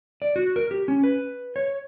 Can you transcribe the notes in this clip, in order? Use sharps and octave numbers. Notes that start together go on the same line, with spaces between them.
D5
F#4
A#4
G4
C#4
B4
C#5